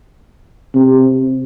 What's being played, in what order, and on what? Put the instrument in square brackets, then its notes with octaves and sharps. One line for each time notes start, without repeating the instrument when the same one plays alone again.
[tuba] C3